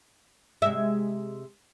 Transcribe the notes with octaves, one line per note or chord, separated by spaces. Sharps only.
C3 G#3 E5